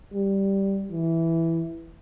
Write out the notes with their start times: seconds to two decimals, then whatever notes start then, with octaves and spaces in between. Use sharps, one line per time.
0.13 G3
0.91 E3